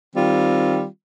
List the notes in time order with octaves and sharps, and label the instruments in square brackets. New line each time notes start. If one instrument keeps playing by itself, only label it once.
[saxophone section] D#3 G3 C4 F4